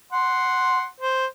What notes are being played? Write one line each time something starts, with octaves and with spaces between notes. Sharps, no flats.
F#5 C6
C5